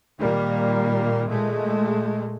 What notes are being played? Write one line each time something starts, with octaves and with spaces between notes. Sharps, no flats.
A#2 D#3 G3 A#3
A#2 G#3 A3